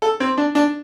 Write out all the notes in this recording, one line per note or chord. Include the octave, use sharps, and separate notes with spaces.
A4
C4
D4
D4